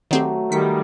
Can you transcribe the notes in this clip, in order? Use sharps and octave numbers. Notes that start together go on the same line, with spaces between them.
D#3 F#3 A3 C4 G4
D#3 G3 B6 C#7